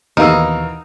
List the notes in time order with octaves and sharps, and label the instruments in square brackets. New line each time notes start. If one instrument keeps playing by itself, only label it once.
[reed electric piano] D#2 [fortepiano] B2 E3 [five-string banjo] D#4 [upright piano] A#4 F5 E6